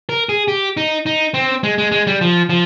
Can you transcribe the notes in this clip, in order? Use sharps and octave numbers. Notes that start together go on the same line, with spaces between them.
A#4
G#4
G4
D#4
D#4
C4
G#3
G#3
G#3
G3
F3
F3